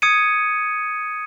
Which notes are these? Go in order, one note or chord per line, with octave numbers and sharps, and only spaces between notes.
D#6 G#6 C#7 D#7